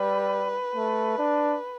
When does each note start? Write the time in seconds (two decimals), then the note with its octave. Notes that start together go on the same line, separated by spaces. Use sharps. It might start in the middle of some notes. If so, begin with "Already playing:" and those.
Already playing: G3 B4
0.76 A3
1.18 D4